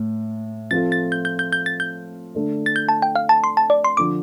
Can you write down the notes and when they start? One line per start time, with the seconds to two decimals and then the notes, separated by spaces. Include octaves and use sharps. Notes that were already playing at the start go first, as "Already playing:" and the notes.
Already playing: A2
0.71 F3 C4 F4 A4 A6
0.92 A6
1.12 G6
1.25 G6
1.39 G6
1.52 G6
1.66 A6
1.80 G6
2.35 D3 A3 D4
2.66 A6
2.76 G6
2.89 A5
3.02 G5
3.15 F5
3.29 A5
3.44 C6
3.57 A5
3.70 D5
3.84 C6
3.97 D3 F3 D4 D6